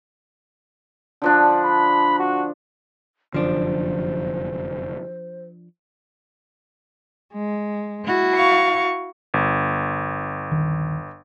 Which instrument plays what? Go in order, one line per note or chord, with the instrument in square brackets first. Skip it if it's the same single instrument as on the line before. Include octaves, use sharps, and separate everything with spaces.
[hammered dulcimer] D3 F3 D4
[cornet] B5
F#4
[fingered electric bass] F1 F#2 D3 [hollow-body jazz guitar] F3 D4 [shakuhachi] C5
[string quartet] G#3
[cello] E4 F#4
[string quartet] F5 C#6
[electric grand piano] G1
[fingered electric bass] D#1 D#3